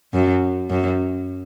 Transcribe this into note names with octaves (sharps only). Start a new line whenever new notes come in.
F#2
F#2